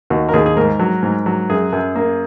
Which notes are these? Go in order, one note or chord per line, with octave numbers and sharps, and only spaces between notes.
D#2 F#4
A#4
D#2 G#4
G#4
G#2 A#4
F#3
G#2
F#3
F#2 G#4
F#2
A#3